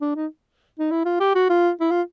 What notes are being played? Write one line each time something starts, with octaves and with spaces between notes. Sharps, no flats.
D4
D#4
D#4
E4
F4
G4
F#4
F4
E4
F4